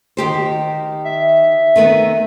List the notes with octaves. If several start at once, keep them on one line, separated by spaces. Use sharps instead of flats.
D#3 G4 C5
E5
D#3 A3 B3